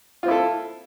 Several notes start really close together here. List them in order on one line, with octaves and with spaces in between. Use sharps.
F4 C4 E4 A4